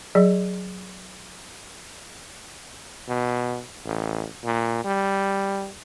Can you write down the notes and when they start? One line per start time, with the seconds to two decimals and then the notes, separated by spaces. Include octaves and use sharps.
0.15 F#3 G#4 D5
3.08 B2
3.85 A1
4.45 A#2
4.84 G3